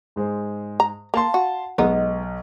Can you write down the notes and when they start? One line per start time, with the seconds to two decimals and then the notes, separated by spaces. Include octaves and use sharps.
0.16 G#2 G#3 C5
0.80 A#5
1.14 A#3 F5 A5 C6
1.34 F#4
1.78 B1 G#3 B3 D#4